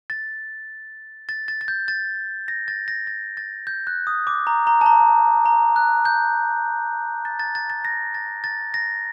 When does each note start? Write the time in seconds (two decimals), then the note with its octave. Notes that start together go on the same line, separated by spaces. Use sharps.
0.10 A6
1.29 A6
1.48 A6
1.61 A6
1.68 G6
1.88 A6
2.48 A#6
2.68 A6
2.88 A#6
3.07 A6
3.37 A6
3.67 G6
3.87 F#6
4.07 D#6
4.27 D6
4.47 A#5
4.67 A#5
4.81 A5
4.86 A#5
5.46 A#5
5.76 F#6
6.05 G6
7.25 A6
7.40 A6
7.55 A6
7.70 A6
7.85 A#6
8.14 A6
8.44 A6
8.74 A#6